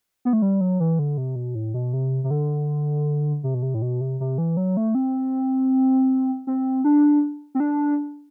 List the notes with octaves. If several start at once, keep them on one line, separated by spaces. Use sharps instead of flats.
B3
A3
G3
F#3
E3
D3
C3
B2
A2
B2
C3
C3
D3
C3
B2
C3
A2
B2
C3
C3
E3
F#3
A3
C4
C4
D4
C4
D4